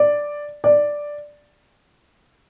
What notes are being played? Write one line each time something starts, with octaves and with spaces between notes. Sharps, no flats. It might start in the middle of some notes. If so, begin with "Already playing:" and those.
Already playing: D5
D5